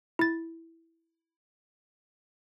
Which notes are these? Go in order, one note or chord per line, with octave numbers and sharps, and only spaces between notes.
E4 A6